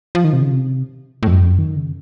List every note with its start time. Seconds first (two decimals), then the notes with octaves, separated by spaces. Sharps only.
0.15 F3
0.24 D#3
0.33 C3
0.42 C#3
0.51 C3
1.23 A2
1.27 F2
1.32 F#2
1.40 F2
1.50 F#2
1.59 D#3
1.76 C#3